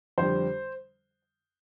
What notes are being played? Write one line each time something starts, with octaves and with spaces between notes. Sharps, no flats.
F2 D3 G3 C5